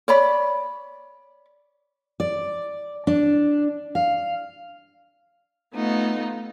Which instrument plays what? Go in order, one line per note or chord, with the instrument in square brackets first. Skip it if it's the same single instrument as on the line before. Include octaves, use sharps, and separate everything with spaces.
[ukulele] C#5 D5 B5
[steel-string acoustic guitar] D5
D4
F5
[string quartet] A3 B3 D#4 F4